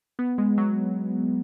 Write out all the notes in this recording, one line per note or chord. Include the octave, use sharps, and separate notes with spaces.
B3
G#3
F#3